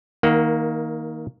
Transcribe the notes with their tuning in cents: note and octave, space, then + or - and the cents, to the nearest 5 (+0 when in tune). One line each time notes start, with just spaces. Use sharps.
D#3 +25 A#3 +0 F#5 +20